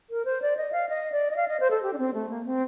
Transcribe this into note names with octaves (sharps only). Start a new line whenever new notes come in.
A#4
C5
D5
D#5
F5
D#5
D5
D#5
F5
D#5
C5
A4
G4
D4
C4
A3
A#3
C4